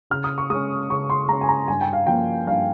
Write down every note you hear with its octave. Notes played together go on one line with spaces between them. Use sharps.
C#3 F6
D#6
C#6
G#3 C#4 D#6
C#3 C#6
C6
G#3 C#4 A#5
G#5
A#5
G2 G#5
G5
F5
F3 A#3 C#4 G5
G2 F5